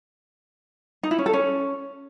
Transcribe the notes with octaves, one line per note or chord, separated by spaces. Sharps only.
D#4
E4
C#4
A4
C#4